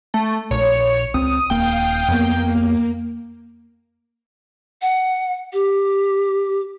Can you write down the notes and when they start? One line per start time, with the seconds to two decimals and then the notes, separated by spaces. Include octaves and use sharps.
0.14 A3
0.51 A#1 A#2 C#5
1.14 C#2 C4 D#6
1.50 D#1 A#3 F5 G5 D#6 C7
2.08 F2 A#3 B3
4.82 F#5
5.53 G4